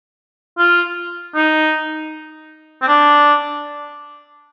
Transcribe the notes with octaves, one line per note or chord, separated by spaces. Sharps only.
F4
D#4
C4
D4